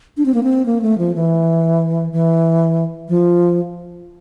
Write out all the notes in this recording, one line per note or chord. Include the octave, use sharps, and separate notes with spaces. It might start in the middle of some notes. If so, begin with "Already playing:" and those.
D4
C4
A#3
C4
A#3
A3
F3
E3
E3
F3